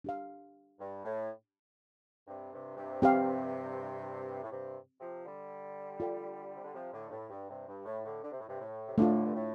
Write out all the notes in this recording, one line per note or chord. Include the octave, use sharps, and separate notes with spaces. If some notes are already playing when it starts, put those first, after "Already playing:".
D4 G4 F5
G2
A2
G2 C3
G2 C3
G2 C3
C4 G4 F5
A2
G2 C3
C3 F3
D3 G3
F4 A4 D5 G5
C3
D3
C3 F3
A2 D3
G2
A2
G2
G2 C3
G2
A2
A2 D3
D3
C3
A2
G2 C3
A2
C3
A2 D3 A3 D4 F4
G2
A2